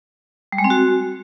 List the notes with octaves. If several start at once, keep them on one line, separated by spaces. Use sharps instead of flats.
G3
G#3
C4
F#4